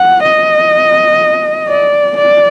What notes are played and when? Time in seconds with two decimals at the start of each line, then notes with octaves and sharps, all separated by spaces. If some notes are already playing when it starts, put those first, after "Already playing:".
Already playing: F#5
0.23 D#5
1.69 D5
2.18 D5